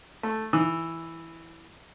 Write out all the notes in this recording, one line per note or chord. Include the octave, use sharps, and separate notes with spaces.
A3
E3